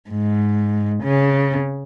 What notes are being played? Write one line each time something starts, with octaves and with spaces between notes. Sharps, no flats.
G#2
C#3